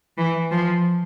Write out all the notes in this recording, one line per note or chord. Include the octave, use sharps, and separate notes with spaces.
E3
F3